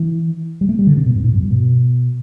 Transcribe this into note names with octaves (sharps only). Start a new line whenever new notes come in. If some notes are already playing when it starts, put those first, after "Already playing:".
Already playing: E3
G3
A3
G3
D3
C3
B2
G2
A2
F#2
G2
B2